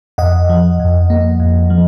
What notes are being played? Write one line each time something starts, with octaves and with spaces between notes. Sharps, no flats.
F2 D#5 F#5
F3
F2
A#3
F2
F3